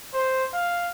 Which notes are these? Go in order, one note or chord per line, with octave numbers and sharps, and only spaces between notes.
C5
F5